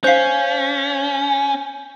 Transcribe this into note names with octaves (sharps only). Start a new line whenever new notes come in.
C#4 C5 F5 G6 C7